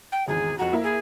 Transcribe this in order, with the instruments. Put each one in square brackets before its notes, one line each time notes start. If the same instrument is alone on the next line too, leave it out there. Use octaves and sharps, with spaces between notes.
[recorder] G5
[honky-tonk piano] G#1 E2 [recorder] G#4
[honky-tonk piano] F2 A#5 [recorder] F#4
[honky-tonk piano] A#3 E4 A#4
[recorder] G#4